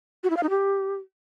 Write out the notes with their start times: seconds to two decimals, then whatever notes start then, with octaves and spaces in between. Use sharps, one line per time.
0.23 F#4
0.30 E4
0.37 F5
0.43 D#4
0.50 G4